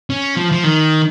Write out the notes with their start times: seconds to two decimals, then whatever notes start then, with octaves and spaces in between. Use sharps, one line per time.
0.10 C#4
0.36 F3
0.52 F3
0.64 D#3